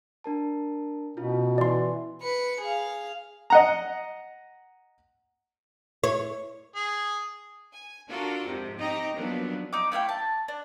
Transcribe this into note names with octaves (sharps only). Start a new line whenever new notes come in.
D4 A#4 A5
B2 C#4 E4 F4
E3 D5 C6
B4 C#7
G#4 F5
D#5 F#5 A#5
C#5
G#4
G#5
D4 F4 F#4 A4 A#4
F2 G#2 C3
C4 D#4 G4 D#5 A#5
D#2 F3 F#3 B3 D4
D#4 D6
A3 E4 F5 G5
A5
D4